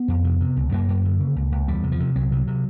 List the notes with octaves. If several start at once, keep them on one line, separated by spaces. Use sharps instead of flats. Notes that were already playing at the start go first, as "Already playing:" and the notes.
Already playing: B3
F2
C3
C3
C#2
F#2 A#3
F#2
D3
C#3
C#2
C#2
E2 G3
C3
F3
C3
C2 F#3
C3
C3